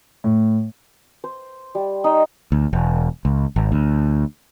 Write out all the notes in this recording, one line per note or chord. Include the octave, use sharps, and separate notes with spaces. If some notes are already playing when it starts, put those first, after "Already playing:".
A2
C5
G3
D#4
D2
E1
C#2
G#1
D2